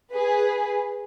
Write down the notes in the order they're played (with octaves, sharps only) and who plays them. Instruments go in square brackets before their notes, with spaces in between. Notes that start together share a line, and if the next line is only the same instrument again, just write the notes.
[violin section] G#4 B4